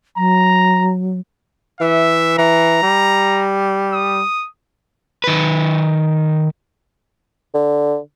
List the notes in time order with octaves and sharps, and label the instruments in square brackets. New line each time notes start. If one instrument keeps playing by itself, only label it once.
[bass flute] F#3 [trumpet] A#5
[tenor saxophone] E3 [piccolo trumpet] E5
[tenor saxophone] E3 [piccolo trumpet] A#5
[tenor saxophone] G3
[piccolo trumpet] D#6
[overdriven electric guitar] D#3 B4
[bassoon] D3